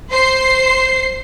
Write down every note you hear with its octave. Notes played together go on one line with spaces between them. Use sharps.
C5 C7